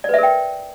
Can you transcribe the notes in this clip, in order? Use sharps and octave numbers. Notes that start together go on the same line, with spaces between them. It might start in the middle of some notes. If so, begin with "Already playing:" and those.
A#4 B4 D5 E5 G5